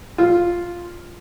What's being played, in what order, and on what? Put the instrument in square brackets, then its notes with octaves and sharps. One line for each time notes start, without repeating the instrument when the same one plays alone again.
[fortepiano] F4